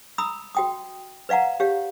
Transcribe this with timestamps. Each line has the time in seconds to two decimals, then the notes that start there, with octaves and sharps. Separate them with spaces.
0.18 A#5 B5 D#6 E6
0.55 F#4 G5 D#6
1.29 B4 D5 F5 F#5 A#5
1.60 G4 C#5 F5